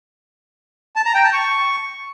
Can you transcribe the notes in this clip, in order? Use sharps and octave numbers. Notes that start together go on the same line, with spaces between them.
A5
A#5
G5
A5
C#6